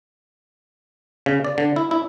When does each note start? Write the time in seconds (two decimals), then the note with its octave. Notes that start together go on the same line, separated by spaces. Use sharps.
1.26 C#3
1.44 D5
1.58 D3
1.76 E4
1.91 E4